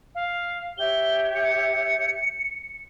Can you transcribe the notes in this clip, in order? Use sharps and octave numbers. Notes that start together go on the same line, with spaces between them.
F5
G4 C#5 E5 G7
C#7